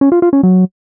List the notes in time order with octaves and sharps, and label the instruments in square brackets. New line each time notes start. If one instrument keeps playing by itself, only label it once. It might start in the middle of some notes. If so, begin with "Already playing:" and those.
[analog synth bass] C#4
F4
F4
C#4
F#3